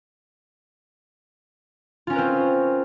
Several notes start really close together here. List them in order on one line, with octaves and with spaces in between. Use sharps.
F4 C#4 A#4 B4 C4